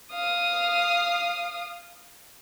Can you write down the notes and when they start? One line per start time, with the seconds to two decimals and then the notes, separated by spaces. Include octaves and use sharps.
0.13 F5 D#6